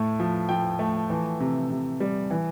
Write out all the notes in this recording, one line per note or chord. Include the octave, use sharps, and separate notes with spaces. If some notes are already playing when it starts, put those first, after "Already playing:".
Already playing: A2 A3
F3
F3 G5
A3
E3
C3
C3
G3
E3